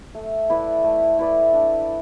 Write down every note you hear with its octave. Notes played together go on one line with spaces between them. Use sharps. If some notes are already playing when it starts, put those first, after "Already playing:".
A3
E4 B4 D5
A3
E4 B4 D5
D4